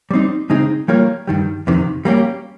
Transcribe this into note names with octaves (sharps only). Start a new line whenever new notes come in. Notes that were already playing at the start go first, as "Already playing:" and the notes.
G3 C4 D#4
C#3 G#3 C4 D#4 G#4
G3 A#3 F4 A#4 C#5
G2 D#3 G3
F2 C3 D#3
G3 A#3 C#4 G4